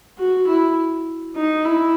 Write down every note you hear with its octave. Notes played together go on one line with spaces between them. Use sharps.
F#4
E4
D#4
E4